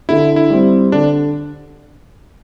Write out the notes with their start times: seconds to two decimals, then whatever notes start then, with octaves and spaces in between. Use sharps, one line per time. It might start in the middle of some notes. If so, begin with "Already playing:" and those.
0.09 D3 E4
0.36 E4
0.50 G3 C4
0.92 D3 D4